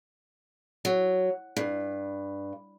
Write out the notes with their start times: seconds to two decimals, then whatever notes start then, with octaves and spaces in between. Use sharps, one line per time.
0.85 F#3
1.56 G2